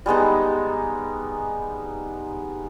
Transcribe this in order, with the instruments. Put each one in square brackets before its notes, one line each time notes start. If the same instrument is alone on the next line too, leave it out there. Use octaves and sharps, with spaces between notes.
[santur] G3 G#3 B3 D#4